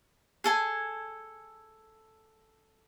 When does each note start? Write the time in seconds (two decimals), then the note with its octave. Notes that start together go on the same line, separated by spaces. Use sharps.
0.44 G#4 A4 G#5